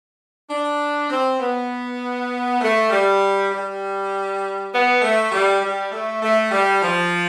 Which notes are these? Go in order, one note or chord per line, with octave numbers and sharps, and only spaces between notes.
D4
C4
B3
A3
G3
G3
B3
A3
G3
G3
A3
A3
G3
F3